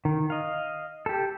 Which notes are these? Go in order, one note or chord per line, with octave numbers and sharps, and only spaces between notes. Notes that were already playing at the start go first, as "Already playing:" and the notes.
D#3
D#5 F5
G4 A4